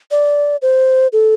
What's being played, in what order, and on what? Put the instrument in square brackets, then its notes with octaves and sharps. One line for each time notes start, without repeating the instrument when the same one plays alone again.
[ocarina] D5
C5
A4